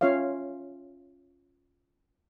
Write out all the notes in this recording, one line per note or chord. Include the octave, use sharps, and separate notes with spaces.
C#4 F4 C#5 E5 F5